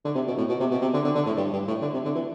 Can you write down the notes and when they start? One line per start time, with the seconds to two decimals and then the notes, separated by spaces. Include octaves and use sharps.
0.05 D3
0.15 C3
0.27 B2
0.38 A2
0.48 B2
0.60 C3
0.71 B2
0.81 C3
0.93 D3
1.04 D3
1.15 D3
1.26 A2
1.37 G2
1.52 G2
1.67 A2
1.81 D3
1.93 C3
2.04 D3
2.15 E3